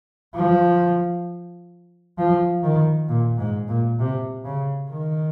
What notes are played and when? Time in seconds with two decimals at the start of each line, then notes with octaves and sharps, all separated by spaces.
0.35 F3
2.18 F3
2.63 D#3
3.09 A#2
3.38 G#2
3.69 A#2
3.99 C3
4.45 C#3
4.91 D#3